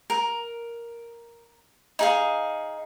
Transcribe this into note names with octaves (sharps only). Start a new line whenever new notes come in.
A#4
D#4 G#4 F5